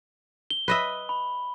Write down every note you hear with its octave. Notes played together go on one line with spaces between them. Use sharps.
G7
B4 D#5 E5
B5